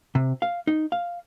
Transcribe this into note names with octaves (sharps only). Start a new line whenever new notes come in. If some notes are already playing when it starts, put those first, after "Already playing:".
C3
F5
D#4
F5